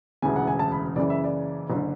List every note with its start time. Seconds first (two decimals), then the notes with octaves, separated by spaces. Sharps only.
0.22 E1 D2 C#3 E3 G#5
0.36 F#5
0.47 G#5
0.59 A5
0.72 B5
0.96 F#1 F#2 C#3 E3 D5
1.10 E5
1.24 D5
1.70 F#1 D3